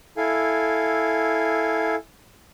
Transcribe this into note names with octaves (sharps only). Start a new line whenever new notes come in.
E4 A4 F5 G#5